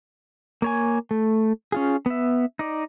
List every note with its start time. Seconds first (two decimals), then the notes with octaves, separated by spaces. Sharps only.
0.62 A#3 C#5 G#5
1.11 A3
1.72 C#4 F4 G#4
2.06 B3 E5
2.59 D#4 D5